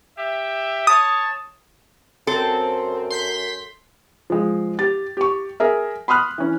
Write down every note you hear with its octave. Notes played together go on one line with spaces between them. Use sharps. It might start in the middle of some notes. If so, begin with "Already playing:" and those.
G4 E5
C#5 A5 D#6
F#2 C4 A4
C6 G6 B6
F3 G#3
G4 A6
G4 C#6
G#4 A#4 E5
B5 C6 D#6 F6 F#6
E3 C#4